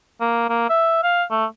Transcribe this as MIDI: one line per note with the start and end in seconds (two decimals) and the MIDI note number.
0.21 0.46 58
0.50 0.65 58
0.69 1.01 76
1.03 1.23 77
1.31 1.45 57